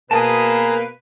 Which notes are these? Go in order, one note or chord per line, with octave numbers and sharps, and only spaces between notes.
B2 A#3 G#4 B4 A5 A#5 D#6